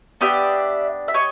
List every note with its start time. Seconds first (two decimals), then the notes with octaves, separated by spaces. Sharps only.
0.21 B3 D4 G4 D5 E5
1.08 E5
1.14 C#5 D#5